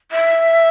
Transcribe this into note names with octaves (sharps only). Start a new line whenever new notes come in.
E5